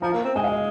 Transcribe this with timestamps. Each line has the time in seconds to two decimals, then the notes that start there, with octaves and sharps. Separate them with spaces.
0.02 F3 A#5
0.13 A#3
0.24 C4
0.35 G#3 G#5
0.44 F5
0.52 D#5